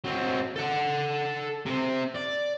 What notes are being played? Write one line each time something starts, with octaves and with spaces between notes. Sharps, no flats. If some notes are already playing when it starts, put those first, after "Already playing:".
F#3 C4
A4 F#5
C3 C4
D5